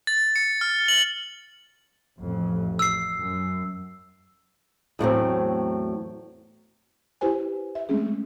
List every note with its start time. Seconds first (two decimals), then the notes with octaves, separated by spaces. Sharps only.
0.07 A6
0.36 C#7
0.61 F6
0.88 F#7
2.19 A1 F2
2.79 E6 C7
3.15 F#2
4.99 E2 A2 F#3 C4
7.21 E4 G4 B4 C5 G#5
7.75 E5
7.89 G#3 A3 C4 C#4 G#4